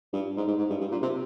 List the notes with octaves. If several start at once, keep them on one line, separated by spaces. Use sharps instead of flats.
G2
G#2
G#2
G#2
G2
G2
A#2
C3